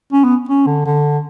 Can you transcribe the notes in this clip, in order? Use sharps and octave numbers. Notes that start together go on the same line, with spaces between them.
C#4
B3
C#4
D3
D3